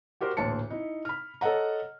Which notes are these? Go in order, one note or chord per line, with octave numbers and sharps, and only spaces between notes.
F#4 G4 A#4 C5
A1 D2 A#2 A5 C#7
D#4 E4
B5 F6
A4 C#5 D#5 F#5 A#5